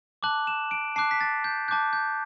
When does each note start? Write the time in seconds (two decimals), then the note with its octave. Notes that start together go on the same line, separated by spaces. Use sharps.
0.23 A5 D6 F#6 F#7
0.47 E7
0.71 D7
0.96 A5 D6 F#6 C7
1.11 B6
1.21 A6
1.44 G6
1.68 A5 D6 F#6 G6
1.93 G6